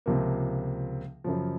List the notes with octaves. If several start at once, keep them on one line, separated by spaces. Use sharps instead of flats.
C#2 C3 F3 A#3
F#2 C#3 F3